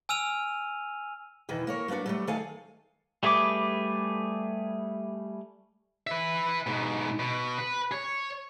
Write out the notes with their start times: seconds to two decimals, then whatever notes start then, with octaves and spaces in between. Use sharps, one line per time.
0.09 G#5 E6 F6 D#7 F7
1.49 E2 B2 D#3 E3
1.67 A#3 A#4 C#5
1.88 F#3 A#3 B3 D4 F#4
2.06 F#3 G3 A3
2.27 D#3 A3 A4 F5 G#5
3.23 G3 A3 G#4 B4 D6
6.07 B4 E5
6.67 G#2 B2
7.19 B2
7.58 B4
7.92 C#5